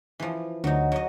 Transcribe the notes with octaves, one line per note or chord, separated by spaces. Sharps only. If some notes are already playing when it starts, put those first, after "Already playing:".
E3 F3
D2 D3 F#3 D#4
F#3 D#5